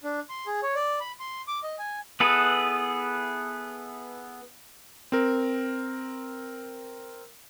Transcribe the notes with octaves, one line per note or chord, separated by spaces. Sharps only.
D4
C6
G#4
C#5
D5
B5
C6
D6
D#5
G#5
B3 E4 G#4 A4 B4
C4 A#4